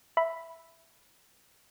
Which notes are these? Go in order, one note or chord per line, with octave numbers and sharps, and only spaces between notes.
E5 B5